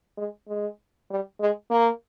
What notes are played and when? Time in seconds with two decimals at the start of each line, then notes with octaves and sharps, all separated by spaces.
0.17 G#3
0.48 G#3
1.10 G3
1.40 G#3
1.70 A#3